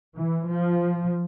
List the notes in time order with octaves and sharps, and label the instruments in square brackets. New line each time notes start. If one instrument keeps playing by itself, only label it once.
[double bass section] E3
F3